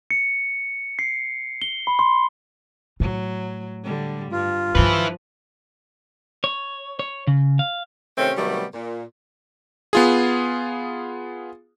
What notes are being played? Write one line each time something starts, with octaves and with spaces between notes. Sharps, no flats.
C#7
C7
G7
B5
C6
A2 F#3
D3 G3
G2 F4
G2 D#3 F3 E4 B4
C#5
C#5
C#3
F5
C3 D#3 A3 C4 C#4
C3 D#3 F#3 G3 A3 B3
A#2
B3 F4 G#4